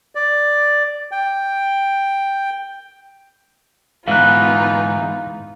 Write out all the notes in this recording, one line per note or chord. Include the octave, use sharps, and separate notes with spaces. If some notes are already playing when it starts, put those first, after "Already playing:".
D5
G5
G#2 E3 B3 D#4 F4 F5 F#6